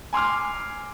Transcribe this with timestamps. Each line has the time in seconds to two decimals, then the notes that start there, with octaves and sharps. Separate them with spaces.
0.13 G#5 C6 D6 F6